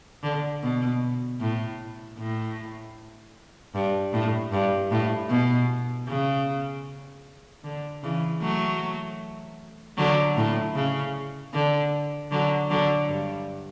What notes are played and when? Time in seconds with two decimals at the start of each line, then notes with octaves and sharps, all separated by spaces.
0.23 D3
0.63 B2
1.41 A2
2.18 A2
3.75 G2
4.13 A2
4.53 G2
4.91 A2
5.30 B2
6.08 C#3
7.64 D3
8.03 C#3 E3
8.42 F#3 A3
9.98 D3 F#3
10.37 A2
10.75 C#3
11.54 D3
12.32 D3 F#3
12.71 D3 F#3
13.09 G2